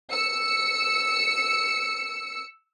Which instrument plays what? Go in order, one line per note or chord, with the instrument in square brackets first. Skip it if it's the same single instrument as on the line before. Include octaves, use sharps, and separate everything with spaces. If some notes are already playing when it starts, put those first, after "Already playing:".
[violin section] E6 C#7